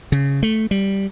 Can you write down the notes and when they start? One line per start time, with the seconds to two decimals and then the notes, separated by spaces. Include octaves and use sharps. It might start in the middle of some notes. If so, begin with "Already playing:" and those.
0.12 C#3
0.43 A3
0.71 G3